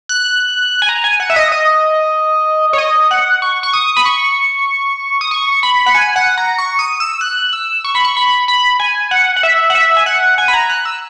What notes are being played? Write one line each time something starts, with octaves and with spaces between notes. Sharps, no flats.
F#6
G#5
A#5
G#5
F#5
E5
D#5
D#5
C#5
D#5
F#5
C#6
C#6
D#6
B5
C#6
D#6
C#6
B5
F#5
G#5
F#5
A#5
C#6
D#6
E6
F#6
E6
C#6
B5
C#6
B5
B5
G#5
F#5
F#5
E5
F#5
E5
G#5
F#5
G#5
B5
A#5
F#6
E6